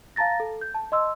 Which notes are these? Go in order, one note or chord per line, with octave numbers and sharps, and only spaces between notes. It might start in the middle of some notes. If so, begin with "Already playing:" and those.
F5 A5 A#5 A6 A#6
A4
G6
A5
D#5 C6 E6